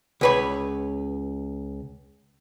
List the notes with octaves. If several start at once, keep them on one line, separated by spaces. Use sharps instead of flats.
C#2 B4 C#5